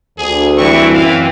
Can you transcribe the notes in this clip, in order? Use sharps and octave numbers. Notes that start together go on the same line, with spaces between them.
D2 G#4
E3 G3 C4 E4 C#6
F#2 F5